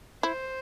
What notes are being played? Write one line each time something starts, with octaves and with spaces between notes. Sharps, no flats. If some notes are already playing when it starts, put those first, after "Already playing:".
E4 C5